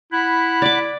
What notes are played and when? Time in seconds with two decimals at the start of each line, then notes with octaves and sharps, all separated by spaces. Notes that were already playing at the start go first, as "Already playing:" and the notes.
0.12 E4 F#5 B5 F#6
0.62 D5 D6